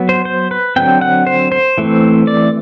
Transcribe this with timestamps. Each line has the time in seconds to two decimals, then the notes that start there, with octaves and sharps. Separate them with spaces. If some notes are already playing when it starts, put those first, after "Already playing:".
Already playing: F#3 B3
0.09 C5
0.25 C5
0.51 B4
0.76 D3 F#3 C4 G5
1.01 F#5
1.27 C5
1.52 C5
1.78 E3 A3 C4
2.27 D5